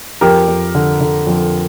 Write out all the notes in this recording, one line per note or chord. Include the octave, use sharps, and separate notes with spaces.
F2 G4 A#4
F2
D3
D3
F2